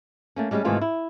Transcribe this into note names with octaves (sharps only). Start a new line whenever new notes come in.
A3 A#3 C#4
G3 G#3 C#4 F#4 G4
G#2 C3 D#3 E3 A3 F4
E4